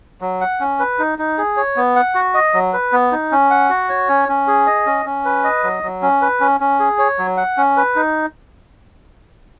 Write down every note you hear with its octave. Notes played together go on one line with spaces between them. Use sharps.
F#3
F#5
C#4
B4
D#4
D#4
G#4
C#5
B3
F#5
F#4
D#5
F#3
B4
B3
D#4
C#4
F#5
F#4
C#5
C#4
C#4
G#4
D#5
C#4
C#4
B4
D#5
F#3
F#3
C#4
B4
C#4
C#4
G#4
C#5
F#3
F#5
C#4
B4
D#4